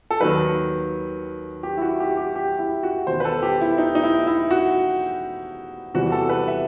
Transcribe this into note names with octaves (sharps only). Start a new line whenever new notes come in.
A4
D#2 D#3 F#3 B4
G4
E4
F#4
G4
G4
G4
E4
F#4
E1 E2 D#3 C5
B4
A4
G4
E4
D#4
D#4
E4
E4
F#4
E2 C3 E3 G3 F#4
A4
B4
E5